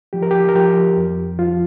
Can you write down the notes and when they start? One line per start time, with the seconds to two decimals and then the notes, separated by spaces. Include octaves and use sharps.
0.13 F3 G4
0.23 A#4
0.31 G4
0.49 A#4
0.55 F3 G4
0.97 F2
1.38 F3 F4